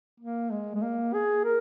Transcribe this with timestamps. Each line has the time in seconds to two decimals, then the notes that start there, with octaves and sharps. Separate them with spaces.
0.20 A#3
0.51 G#3
0.75 G#3
0.83 A#3
1.14 G#4
1.45 A#4